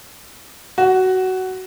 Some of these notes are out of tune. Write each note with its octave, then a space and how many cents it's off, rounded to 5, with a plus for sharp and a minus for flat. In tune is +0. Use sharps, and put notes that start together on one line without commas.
F#4 +15